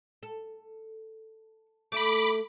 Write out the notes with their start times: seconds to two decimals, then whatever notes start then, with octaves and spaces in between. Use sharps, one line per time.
0.23 A4
1.92 A3 E5 B5 D6